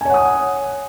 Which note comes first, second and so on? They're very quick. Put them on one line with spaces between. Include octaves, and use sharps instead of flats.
G#5 C#5 F#5 D#6